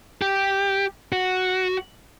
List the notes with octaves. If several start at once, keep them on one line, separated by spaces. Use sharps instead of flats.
G4
F#4